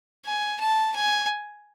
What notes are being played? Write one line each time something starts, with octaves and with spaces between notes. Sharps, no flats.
G#5
A5
G#5